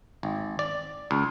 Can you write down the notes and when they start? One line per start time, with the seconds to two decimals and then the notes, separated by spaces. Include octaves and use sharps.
0.23 G#1
0.59 D5
1.11 C#2